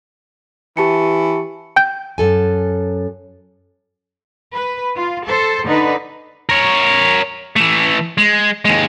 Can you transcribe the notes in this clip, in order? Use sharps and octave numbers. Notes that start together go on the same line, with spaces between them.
E3 G4 A5 C#7
G5 G6
F#2 A4 G#5
B4
F4
A4 C5
D3 D#4 B4
A#4 C#5
E3 A3
G#3
D#2 G#3